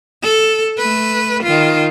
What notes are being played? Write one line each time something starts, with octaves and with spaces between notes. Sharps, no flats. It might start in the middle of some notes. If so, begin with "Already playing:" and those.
A4
A3 B4
D#3 F4